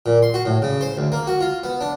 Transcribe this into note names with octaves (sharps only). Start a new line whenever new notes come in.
A#2
C6
F#4
A2
C#3
C5
D2
A#3
F#4
F4
B3
D4